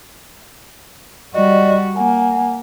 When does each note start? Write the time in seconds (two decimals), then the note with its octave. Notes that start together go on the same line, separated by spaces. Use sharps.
1.34 G3 F#4 D5 D#5
1.96 A#3 F#5 G#5